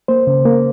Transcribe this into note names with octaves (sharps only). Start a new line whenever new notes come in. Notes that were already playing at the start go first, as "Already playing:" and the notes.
A#3 C5
C#3
A#3